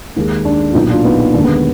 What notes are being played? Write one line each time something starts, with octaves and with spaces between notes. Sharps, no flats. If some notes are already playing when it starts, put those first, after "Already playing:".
D#2 D#3 G#3
D4
F4
B1 A#2 F#3 B3 D#4
D4 F4
B3 D#4
D#2 D3 G#3 D4
B3